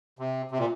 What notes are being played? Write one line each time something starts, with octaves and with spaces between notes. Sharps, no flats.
C3
C3
A#2